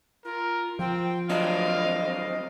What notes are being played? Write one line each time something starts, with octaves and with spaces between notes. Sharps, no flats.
F4 A#4
F3 C4 G5
F#3 C4 D4 D#5 F5